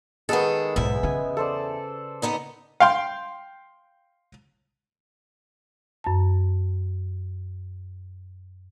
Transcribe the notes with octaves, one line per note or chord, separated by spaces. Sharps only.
D#3 G#3 B3 G#4 A4
B1 E2 G#2 E5
C#3 G#5
A4 C5 D5
B3 D#4 D#5
F5 G5 C6
F#2 A5